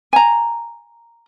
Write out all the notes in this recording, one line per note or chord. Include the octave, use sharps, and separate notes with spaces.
G#5 A#5